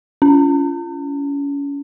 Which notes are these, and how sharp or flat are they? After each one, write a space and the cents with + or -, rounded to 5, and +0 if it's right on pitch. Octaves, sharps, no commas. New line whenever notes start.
C#4 +30